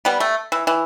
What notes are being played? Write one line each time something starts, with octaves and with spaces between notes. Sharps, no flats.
G3 B3
A3
E3
E3